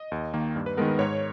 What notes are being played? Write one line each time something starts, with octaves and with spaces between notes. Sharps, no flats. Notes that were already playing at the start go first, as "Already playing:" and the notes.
Already playing: D#5
D#2
D#3 A#3
G2
B4
D#3 G#3 B3 A#4
B4
G#2 C#5